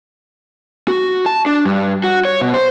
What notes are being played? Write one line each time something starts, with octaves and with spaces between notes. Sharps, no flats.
F#4
A5
D4
G2
F#4
C#5
B2
C5